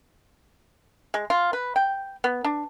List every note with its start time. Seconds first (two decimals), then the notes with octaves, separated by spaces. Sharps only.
1.14 G#3
1.30 F4
1.53 B4
1.76 G5
2.24 B3
2.44 D4